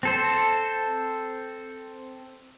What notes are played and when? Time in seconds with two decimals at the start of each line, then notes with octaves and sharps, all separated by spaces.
0.03 C4 A4 C5